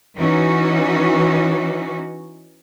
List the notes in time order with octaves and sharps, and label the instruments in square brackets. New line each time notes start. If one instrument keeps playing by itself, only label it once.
[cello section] E3 C#4 D#4 F#4